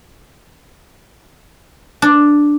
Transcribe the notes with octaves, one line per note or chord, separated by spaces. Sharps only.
D4